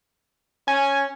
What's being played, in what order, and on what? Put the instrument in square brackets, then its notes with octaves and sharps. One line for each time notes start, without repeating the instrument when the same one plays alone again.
[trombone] C#4 [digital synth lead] G#5